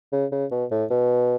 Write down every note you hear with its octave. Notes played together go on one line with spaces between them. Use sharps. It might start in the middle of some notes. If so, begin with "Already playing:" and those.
C#3
C#3
B2
A2
B2